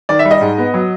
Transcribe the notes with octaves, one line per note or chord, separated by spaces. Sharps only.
D#3 D5
E5
G3
D#5
G#2
B3
F#3